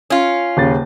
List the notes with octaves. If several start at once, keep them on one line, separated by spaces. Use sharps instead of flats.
C#4 F4
D#1 C#3 A6